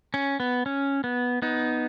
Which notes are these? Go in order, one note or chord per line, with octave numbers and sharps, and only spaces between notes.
C#4
B3
C#4
B3
B3 D#4